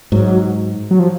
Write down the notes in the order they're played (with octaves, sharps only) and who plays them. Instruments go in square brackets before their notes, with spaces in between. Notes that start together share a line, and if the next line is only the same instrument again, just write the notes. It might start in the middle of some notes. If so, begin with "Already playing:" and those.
[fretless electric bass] G#2 [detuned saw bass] F#3
[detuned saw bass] F#3
F3